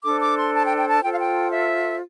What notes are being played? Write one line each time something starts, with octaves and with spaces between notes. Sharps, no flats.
D4 A4 C5 D6
D6
C6
A5
G5
G5
A5
F4 A4 C5 G5
F5
G5
E5